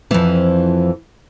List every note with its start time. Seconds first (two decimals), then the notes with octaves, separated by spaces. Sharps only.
0.11 F2 E3 F3